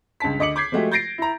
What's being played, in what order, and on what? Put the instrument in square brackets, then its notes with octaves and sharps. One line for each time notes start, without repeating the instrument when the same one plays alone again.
[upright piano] C#2 G2 A5 B6
D2 D#5 D6 C#7 F#7
D6 G6 G#6 B6 C7
F3 G#3 A3 F#4 G4
G6 A6 A#6 C7 D7
E4 A#5